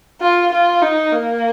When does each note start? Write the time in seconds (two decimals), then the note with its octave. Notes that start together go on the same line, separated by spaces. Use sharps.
0.21 F4
0.52 F4
0.82 D#4
1.12 A#3